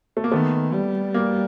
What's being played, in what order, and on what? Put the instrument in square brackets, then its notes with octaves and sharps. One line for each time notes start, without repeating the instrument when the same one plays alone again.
[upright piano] A3
A#3
[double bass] D#3 [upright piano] A3 B3
[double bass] G3
[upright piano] A#3